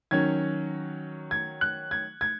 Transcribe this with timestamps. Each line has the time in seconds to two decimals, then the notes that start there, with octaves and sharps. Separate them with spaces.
0.11 D#3 F#3 C#4 G#6
1.31 G#6
1.61 F#6
1.91 G#6
2.21 G#6